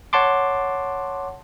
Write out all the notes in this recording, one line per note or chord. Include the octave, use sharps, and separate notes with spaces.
C#5 F#5 A5 C6 D6